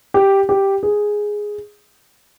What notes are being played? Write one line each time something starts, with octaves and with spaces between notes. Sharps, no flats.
G4
G4
G#4